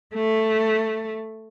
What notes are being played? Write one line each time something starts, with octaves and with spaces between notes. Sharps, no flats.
A3